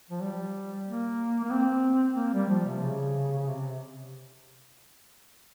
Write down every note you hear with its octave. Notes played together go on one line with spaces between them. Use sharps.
F3
G3
A#3
A#3
C4
A#3
G3
F3
C3
C#3
C#3
C3